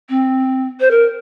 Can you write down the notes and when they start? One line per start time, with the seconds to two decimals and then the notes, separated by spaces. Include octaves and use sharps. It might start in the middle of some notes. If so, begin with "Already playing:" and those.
0.09 C4
0.80 C5
0.91 A#4